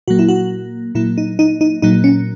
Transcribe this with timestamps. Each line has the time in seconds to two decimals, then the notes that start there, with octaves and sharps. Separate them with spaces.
0.08 A#2 F#3 A#3 F#4
0.19 E4
0.28 F#4
0.95 A#2 F#3 A#3 E4
1.18 D#4
1.39 D#4
1.61 D#4
1.82 A#2 F#3 A#3 D#4
2.04 C#4